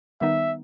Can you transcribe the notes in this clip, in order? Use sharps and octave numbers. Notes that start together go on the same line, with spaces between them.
D#3 G3 B3 D#4 E5